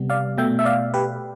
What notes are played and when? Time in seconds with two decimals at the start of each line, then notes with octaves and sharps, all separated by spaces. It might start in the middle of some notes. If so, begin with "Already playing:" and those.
Already playing: C3 G3 B3
0.10 D5 F5
0.38 B2 A3 E5 G5
0.59 E5
0.65 D5 F5
0.94 G4 B4